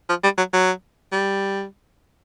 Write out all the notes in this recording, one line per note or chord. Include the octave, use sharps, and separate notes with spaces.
F3
G3
F#3
F#3
G3